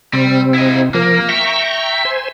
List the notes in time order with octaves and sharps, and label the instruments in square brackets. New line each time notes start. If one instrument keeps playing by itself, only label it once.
[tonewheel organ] C3 C4 [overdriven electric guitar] G3
[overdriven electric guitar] E4 D#5
[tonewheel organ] F3 A#4 [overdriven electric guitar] A#3
[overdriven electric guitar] E5 [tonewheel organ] G5 A#5 C#6
[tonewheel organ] C5 G#5 C6